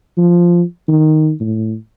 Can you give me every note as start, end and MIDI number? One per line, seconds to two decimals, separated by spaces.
0.18 0.62 53
0.88 1.32 51
1.40 1.74 45